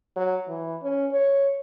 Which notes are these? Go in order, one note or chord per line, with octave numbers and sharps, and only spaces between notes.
F#3
E3
C#4
C#5